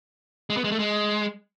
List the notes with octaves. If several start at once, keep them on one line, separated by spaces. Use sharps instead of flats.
G#3
B3
G#3
A3
G#3